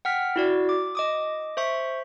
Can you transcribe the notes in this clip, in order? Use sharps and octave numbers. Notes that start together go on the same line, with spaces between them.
F#5 G5 F6 B6
E4 F#4 D5
D6
D#5 D6 D#6
C5 E5 C#6